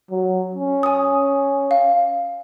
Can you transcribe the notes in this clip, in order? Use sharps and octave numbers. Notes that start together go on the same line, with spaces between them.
F#3
C#4
G#5 D#6
F5